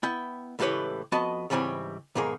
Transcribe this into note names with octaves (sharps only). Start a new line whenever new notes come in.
B3 E4 G5
C#2 A2 E3 G4 B4 C#5
F2 F3 B3 F#4 D#5 A5
C#2 G#2 E3 G3 C4 C#5
B1 G#2 D#3 A#3 G#4